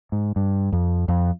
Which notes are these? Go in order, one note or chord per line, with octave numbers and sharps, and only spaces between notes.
G#2
G2
F2
F2